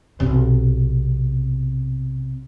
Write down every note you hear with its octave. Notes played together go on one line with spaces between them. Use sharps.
B1 C3